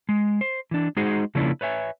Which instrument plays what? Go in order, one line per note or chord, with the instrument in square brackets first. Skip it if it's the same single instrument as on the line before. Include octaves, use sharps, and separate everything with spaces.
[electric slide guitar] G#3
C5
E3 D4
G#3 D#4 F#4 G#4 C5
C#3 F3 A#3 C#4 D4 E4
B4 C#5 E5 G#5